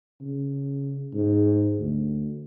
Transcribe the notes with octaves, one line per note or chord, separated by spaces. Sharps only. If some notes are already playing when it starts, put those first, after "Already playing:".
C#3
G#2
D2